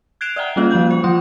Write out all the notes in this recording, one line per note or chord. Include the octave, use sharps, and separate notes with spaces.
F#6 G#6 C7 D7 E7 F7
D5 E5 F#5 G5 A#5
G3 A#3 C#4 F4 D#5 F5
F3 A#3 F5 G6
C5
F3 F4 C6 D#6